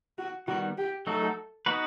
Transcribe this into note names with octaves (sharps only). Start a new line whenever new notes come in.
F#4
D#3 G3 B3 F#4
G4
F#3 A3 D#4 F#4 A4
B3 D#4 F#4 B4